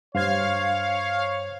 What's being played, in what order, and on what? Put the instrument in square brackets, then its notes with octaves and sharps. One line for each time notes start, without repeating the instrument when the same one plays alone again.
[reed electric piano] G2 C5 G#6 [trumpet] C#5 [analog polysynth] F5